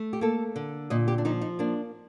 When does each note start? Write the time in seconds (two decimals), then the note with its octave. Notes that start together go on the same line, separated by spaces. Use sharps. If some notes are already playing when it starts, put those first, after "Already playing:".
Already playing: A3
0.13 G4
0.21 A#3 A4
0.56 D3
0.90 A#2 D#5
1.08 G4
1.18 D4
1.25 F3 D#4
1.41 D#4
1.59 A#3 D4